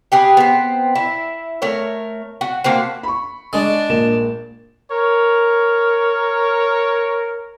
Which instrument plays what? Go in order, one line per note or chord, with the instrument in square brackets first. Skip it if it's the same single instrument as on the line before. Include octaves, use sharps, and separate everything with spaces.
[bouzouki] G4 G#4 B4
B3 C4
E4
A3 A#4 C#5
F#4
A3 A#3 C4 F#4
[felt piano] B5 C#6
[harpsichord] G#3 [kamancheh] D4
[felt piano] A#1 A#4 E7
[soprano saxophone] A#4 [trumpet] C#5